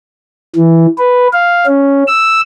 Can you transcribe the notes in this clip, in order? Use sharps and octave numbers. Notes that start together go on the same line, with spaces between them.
E3
B4
F5
C#4
E6